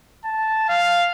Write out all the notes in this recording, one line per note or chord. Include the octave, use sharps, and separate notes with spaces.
A5
F5